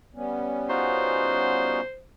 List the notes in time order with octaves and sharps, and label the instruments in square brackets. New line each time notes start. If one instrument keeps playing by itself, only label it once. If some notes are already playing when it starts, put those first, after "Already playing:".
[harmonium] G3 B3 C#4
[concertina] D#4 F4 F#4 [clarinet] C5